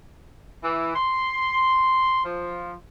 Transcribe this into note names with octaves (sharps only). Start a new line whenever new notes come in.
E3
C6
F3